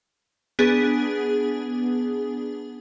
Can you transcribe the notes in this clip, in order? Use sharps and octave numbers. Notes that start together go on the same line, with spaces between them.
B3 D4 G#4